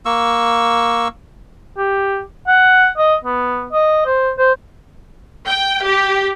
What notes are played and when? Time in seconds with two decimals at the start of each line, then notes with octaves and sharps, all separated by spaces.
0.06 A#3 C#6 E6
1.77 G4
2.48 F#5
2.98 D#5
3.25 B3
3.72 D#5
4.06 C5
4.38 C5
5.45 G5
5.84 G4